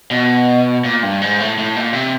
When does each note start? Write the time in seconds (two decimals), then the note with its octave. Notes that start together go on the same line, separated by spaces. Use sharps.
0.11 B2
0.84 A#2
1.03 G2
1.21 G#2
1.40 A2
1.58 A2
1.76 A#2
1.94 C3